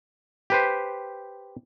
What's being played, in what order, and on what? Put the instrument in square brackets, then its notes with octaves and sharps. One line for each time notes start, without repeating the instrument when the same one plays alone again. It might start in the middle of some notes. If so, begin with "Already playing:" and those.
[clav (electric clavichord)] G4 B4 C5